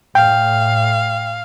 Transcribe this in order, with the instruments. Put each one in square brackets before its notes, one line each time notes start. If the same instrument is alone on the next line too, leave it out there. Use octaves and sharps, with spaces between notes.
[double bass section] A2 [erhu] F5 [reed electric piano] G5